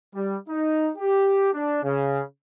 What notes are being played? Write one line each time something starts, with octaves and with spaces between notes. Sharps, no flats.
G3
D#4
G4
D4
C#3